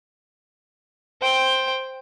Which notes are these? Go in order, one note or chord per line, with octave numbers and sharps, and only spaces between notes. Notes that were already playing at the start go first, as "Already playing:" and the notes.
C5 G5